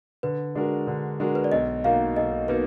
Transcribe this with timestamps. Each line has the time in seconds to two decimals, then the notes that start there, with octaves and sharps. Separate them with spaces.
0.23 D3 B4
0.55 G#3 D4 F#4 A#4
0.87 D3
1.20 G#3 D4 F#4 A#4
1.35 B4
1.44 D5
1.52 B1 D#5
1.84 B2 A#3 D#4 F5
2.16 B1 D#5
2.48 B2 A#3 D#4 B4